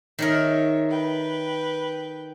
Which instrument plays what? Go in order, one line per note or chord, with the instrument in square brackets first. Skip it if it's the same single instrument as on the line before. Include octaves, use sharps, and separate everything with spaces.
[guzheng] D#3 G#4 A#4 [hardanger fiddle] C#5 E5
[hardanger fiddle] B4 G5